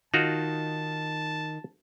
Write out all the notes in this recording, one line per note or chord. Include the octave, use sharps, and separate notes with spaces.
D#3 D#4 F4 F#4 A5